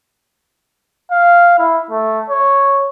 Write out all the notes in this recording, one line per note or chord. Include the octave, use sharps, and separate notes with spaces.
F5
E4
A3
C#5